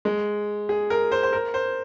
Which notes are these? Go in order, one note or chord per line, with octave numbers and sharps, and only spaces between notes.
G#3
G#4
A#4
C5
C5
A#4
C5